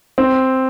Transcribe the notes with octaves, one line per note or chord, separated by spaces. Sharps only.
C4